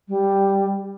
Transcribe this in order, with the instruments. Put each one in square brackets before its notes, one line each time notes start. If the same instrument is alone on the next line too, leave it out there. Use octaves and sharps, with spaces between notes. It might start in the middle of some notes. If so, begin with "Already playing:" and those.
[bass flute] G3